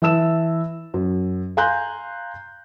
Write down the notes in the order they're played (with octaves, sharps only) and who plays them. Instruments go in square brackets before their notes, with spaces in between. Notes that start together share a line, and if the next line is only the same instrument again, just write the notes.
[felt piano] E3 E5 A5 E6 E7
F#2
F5 G#5 A#5 C6 F#6 G6